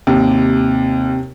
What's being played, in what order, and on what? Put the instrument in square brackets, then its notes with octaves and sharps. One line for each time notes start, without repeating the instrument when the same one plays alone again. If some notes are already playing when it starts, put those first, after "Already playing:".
[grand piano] D#2 [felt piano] C3